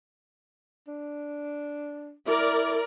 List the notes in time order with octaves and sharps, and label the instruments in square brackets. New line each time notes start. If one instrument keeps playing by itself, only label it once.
[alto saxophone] D4
[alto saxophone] E4 [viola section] A#4 D5